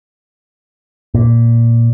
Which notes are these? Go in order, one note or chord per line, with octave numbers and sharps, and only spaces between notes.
A#2